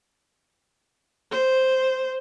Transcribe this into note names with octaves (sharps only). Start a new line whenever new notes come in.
C5